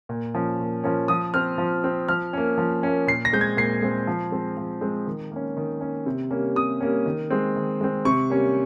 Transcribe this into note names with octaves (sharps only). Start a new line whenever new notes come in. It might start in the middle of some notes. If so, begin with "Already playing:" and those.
A#2
F3 A#3 C#4
A#2
F3 A#3 C#4
F3 D#6
C4 F6
F3
C4
F3 F6
A#3 C#4
F3
A#3 C#4
A#2 C7
A#6
G#3 C4 G6
G#6
A#2 C7
G#3 C4
F3
G#3 C4
F3
G#3 C4
D#3
A#3 C#4
D#3
A#3 C#4
C3
G3 A#3 C#4
C3 D#6
G3 A#3 C#4
D#3
G#3 C4
D#3
G#3 C4
C3 C#6
G3 A#3 C#4